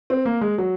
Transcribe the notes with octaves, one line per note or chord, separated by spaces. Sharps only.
C4
A#3
G#3
F#3